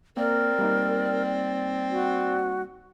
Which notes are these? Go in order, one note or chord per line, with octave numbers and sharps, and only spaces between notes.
A#3 C4 A#4 D5
G3 A#3 D#4
F#4